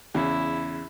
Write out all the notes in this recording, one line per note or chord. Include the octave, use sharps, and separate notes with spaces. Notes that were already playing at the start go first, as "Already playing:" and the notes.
E2 C#3 E4